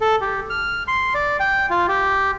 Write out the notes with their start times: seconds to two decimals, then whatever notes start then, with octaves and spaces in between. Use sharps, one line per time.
0.01 A4
0.21 G4
0.50 F6
0.88 C6
1.15 D5
1.40 G5
1.70 F4
1.88 G4